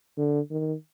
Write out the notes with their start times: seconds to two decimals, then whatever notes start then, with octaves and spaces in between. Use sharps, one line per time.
0.18 D3
0.51 D#3